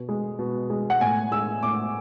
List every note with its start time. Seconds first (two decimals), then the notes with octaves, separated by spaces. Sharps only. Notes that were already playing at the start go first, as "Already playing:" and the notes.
Already playing: B2
0.09 G#3
0.39 B2
0.70 G#3
0.90 F#5
1.01 A2 G#5
1.31 G#3 E6
1.63 A2 D6